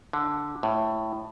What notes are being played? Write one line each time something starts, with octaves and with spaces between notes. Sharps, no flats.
D3
A2